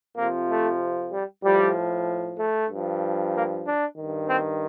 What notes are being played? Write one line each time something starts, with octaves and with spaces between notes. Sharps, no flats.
F2 C3 F3 A#3
A3
G3
A2 F3 G3
A3
G2 F3
A#3
D4
G2 D#3
C4